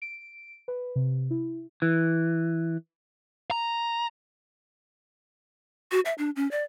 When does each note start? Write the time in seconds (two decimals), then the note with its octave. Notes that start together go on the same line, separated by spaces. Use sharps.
0.02 D7
0.68 B4
0.96 C3
1.31 E4
1.82 E3
3.51 A#5
5.92 F#4
6.05 E5
6.18 D4
6.36 C#4
6.51 D5